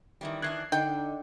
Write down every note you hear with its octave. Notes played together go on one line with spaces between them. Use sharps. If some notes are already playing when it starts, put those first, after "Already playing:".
D#3 E3 G3
D#3 E3 D4 F#6 G#6 C7
D3 D#4 G5